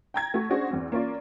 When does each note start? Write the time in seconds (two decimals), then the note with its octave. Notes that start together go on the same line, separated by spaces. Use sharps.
0.14 G5 A#5 G#6
0.34 A3 F#4
0.50 C#4 D4 F#4 G#4 C5
0.71 E2 C4
0.92 A#3 C#4 F4 D5